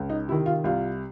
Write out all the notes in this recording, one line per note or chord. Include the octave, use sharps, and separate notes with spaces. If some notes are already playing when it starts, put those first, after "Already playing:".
Already playing: C#2
D#4
C3 D#3 E4
F4
C2 F4